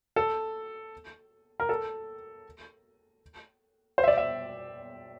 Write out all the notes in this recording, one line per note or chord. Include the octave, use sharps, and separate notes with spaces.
A4
A#4
A4
C5
E5
D5
E5